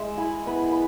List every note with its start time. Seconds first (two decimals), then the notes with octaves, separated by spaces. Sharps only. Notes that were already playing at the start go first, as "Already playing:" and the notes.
Already playing: G#3 E5
0.17 E4 G#5 B5
0.46 B3 G#5 B5
0.71 B5